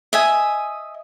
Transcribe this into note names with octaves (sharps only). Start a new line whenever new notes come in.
D#5 E5 G#5